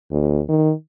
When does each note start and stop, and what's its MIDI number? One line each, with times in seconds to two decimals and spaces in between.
0.11 0.41 38
0.49 0.73 51